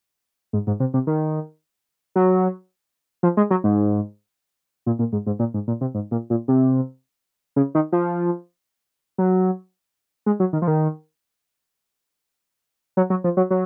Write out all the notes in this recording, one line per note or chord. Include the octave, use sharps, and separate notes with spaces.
G#2
G#2
C3
C3
D#3
F#3
F3
G#3
F#3
G#2
A#2
A#2
G#2
G#2
A#2
G#2
A#2
C3
G#2
A#2
A#2
C3
C#3
D#3
F3
F#3
G#3
F#3
D#3
F3
D#3
F#3
F#3
F3
F#3
F#3